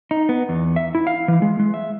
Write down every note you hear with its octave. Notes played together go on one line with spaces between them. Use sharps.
D#4
B3
E2
E5
E4
F5
E3
G#3
G#3
E5